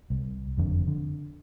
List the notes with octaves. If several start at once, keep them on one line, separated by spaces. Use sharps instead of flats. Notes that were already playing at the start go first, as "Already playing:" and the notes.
C2
F#1 F2 D3
D3